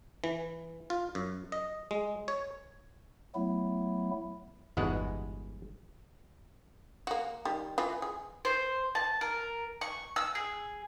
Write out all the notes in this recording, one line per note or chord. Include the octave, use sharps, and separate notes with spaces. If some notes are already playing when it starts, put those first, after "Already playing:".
E3
F4
F#2
D#5
G#3
C#5
F#3 A3 B3 E4
G1 E2 G#2 B2 G#3 F#5
A#3 F#4
D#3 G3
E3 F4 B4
G#4
C5
A5
A#4
C#6
E6
G#4